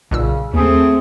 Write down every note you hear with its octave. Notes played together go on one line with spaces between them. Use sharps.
B1 A#2 C#3 E6
D#2 A3 C4 G#4